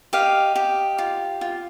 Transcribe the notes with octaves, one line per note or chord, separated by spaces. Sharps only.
G4 D#5 F5
G4
F4
F4